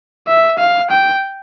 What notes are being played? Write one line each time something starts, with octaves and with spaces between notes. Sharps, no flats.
E5
F5
G5